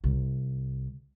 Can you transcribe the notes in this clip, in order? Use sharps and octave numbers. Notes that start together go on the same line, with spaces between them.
C2